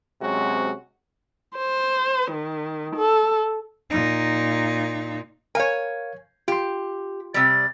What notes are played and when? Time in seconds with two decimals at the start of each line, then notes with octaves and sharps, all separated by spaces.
0.21 C3 F#3 G#3 C4 C#4 F#4
1.56 C5
2.32 D#3
2.96 A4
3.91 A#2 D#4
5.55 A#4 C#5 F5 G#5
6.48 F4 G4 C6
7.34 C3 G3 A6